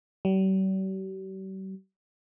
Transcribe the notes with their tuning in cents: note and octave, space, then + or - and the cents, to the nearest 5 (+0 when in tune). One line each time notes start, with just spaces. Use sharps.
G3 -45